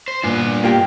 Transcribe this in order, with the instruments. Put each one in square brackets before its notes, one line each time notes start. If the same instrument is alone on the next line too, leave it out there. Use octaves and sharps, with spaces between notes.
[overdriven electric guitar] C5
[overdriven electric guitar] G2 B3 [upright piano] A#2
[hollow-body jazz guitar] A#3 G4 [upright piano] F4